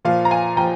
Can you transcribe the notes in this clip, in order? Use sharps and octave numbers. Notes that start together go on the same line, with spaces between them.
A#2 F3 F5
A#5
F5 G#5
A#2 F3 G5 A#5